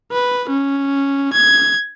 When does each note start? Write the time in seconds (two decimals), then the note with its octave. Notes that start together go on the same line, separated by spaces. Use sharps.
0.12 B4
0.49 C#4
1.33 G#6